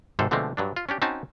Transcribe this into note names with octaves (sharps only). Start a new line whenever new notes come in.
G#1 G#2 C3 A4 C5
B2 D3 F3 G#3 A3 C4
G2 F#3 D4
F4
C#4 D4 G4
C4 C#4 D#4 F#4 G#5 A5